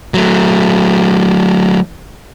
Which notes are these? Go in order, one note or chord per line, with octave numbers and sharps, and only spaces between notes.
F#3 A3